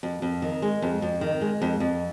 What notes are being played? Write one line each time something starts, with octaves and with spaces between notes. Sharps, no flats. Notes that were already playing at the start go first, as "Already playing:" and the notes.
F2
F2
D#3
G#3
F2
F2
D#3
G#3
F2
F2